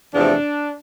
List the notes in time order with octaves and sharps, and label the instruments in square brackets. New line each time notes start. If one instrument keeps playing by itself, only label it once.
[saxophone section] E2 C3 F3 A3 D4